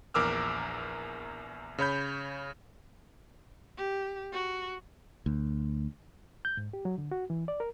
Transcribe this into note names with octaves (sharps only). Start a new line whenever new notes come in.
A#1 E2 A#4 D6 E6 F6
C#3 C#5 B5 G6
G4
F#4
D2
G6
G#2
G4
F#3
D3
F#4
E3
D5
A#4